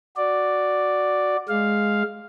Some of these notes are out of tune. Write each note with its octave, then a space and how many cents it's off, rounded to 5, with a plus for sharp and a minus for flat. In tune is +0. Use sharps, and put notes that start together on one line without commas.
F#4 +0 D5 +0
G#3 +0 F5 +0